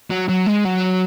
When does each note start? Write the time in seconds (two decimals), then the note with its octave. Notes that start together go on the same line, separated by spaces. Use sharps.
0.11 F#3
0.29 F#3
0.47 G#3
0.65 F#3